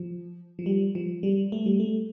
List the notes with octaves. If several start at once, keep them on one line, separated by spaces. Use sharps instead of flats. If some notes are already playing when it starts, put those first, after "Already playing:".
Already playing: F3
F3
G3
F3
G3
A3
G3
A3